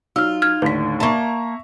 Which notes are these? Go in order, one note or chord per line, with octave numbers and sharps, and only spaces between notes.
F#3 D#4 F4 E6 F6
F6 G#6
D#2 A2 D3 B4 B6
A#3 E5 A5 A#5 C#6